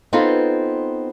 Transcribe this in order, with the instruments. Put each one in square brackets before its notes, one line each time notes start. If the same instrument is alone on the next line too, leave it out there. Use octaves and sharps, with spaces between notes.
[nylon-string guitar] B3 C4 D#4 F4 A4 B4